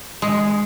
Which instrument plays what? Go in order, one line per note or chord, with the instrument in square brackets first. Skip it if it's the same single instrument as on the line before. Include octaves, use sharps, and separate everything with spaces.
[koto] G#3